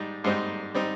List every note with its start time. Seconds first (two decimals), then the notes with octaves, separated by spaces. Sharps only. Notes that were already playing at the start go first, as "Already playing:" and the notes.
Already playing: G#2 G3 D#4
0.24 G#2 G3 C4 D#4
0.75 G3 C4 D#4